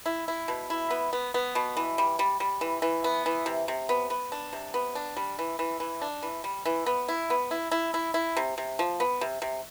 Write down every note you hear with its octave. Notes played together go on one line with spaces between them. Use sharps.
E4
E4
B2
E4
B3
B3
B3
B2
E3
G3
G3
G3
E3
E3
B3
E3
C3
C3
B3
B3
D4
C3
B3
D4
G3
E3
E3
E3
D4
E3
G3
E3
B3
E4
B3
E4
E4
E4
E4
C3
C3
F3
B3
C3
C3